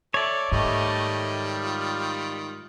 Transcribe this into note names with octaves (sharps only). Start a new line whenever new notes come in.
A4 C#5 D5 E5
G#2 D#3 G3 A3 D#5
F4